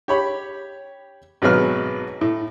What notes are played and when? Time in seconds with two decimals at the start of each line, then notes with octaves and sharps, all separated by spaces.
0.08 G4 C#5 B5
1.42 G#1 B2 F#3 G#4 B4 F6
2.21 A2